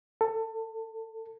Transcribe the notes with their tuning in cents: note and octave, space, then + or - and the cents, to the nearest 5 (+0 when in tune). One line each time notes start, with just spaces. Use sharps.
A4 +25